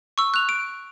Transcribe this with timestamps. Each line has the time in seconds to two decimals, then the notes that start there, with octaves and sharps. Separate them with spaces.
0.18 C#6 E6
0.34 F#6 F7
0.49 D7